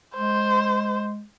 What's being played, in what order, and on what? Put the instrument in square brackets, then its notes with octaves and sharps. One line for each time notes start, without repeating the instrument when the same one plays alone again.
[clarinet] G#3 [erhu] C5